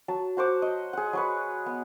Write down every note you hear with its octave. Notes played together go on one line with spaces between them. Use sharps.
F#3 A5
F#4 C5 F#5 D6
D#5
G#4 F#5
F#3 F#4 B4
B3